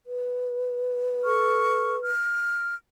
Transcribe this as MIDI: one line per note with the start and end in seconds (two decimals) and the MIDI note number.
0.07 2.11 71
1.23 1.95 69
1.23 1.95 85
1.23 1.95 89
2.03 2.75 89